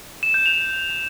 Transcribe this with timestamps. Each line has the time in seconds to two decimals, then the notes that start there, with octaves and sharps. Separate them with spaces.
0.23 E7
0.34 G6
0.46 F7